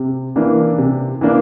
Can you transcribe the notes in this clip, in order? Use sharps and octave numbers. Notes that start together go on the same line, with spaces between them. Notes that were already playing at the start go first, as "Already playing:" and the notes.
Already playing: C3
E3 A#3 D4
C3
E3 A#3 D4